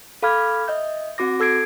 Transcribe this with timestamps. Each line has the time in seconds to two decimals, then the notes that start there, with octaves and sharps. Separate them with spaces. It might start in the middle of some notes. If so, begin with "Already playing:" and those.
0.22 A4 F5 B5 D6 F6 G#6
0.68 D#5 E5 G6
1.18 C4 F#4 D6 A#6
1.40 A4 E6 G#6 C7 D7